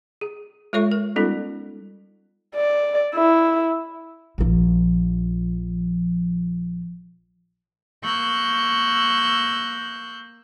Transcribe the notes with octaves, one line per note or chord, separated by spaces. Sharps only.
G#4
G#3 F4 A4 C#5 E5 C#6
A#4
G3 B3 C#4 D#4 F4 A4
D5
E4
A#1 F3
A#3 C#6 E6 F#6 G6